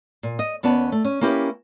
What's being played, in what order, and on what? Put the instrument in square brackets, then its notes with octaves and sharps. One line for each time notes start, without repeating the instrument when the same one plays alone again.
[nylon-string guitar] A#2
D#5
D#2 B3 C#4 D5 A5
A3
C#4
A#3 C#4 E4 G4 A4 B4